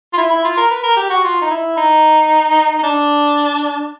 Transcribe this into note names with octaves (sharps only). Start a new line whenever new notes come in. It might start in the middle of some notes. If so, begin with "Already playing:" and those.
F4
E4
E4
F4
A#4
B4
A#4
G4
F#4
F4
D#4
E4
D#4
D#4
D4